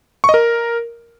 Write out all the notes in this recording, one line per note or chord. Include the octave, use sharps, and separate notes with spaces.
C#6
D#5
A#4